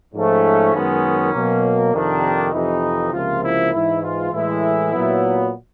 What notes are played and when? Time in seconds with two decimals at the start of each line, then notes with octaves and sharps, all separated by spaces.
0.14 G#2 F3 A3 C#4
0.74 F#2 D#3 G#3 B3
1.33 B2 F#3 A#3
1.93 F2 C3 D#3 D4
2.53 F2 C3 E3 D#4
3.12 C#2 C3 F3 A#3 F4
3.42 E4
3.72 G#2 E3 G#3 E4
4.03 F4
4.32 A2 E3 G#3 E4
4.92 A#2 F#3 B3